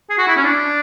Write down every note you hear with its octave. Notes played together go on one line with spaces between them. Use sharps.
G#4
F#4
E4
C#4
D4